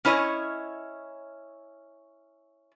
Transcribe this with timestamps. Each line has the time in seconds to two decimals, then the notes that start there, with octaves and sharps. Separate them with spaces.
0.05 C#4 E4 C#5 D#5